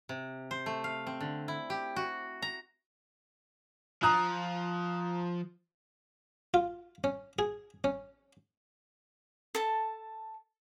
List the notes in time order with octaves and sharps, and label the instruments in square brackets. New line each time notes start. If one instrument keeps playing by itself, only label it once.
[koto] C3
C5
A3
F5
C4
D3
E4
G4
F#4
A#5
[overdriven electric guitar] F3 [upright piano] A#5 D#6 F#6
[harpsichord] F4
C#4
G#4
C#4
[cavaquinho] A4 A5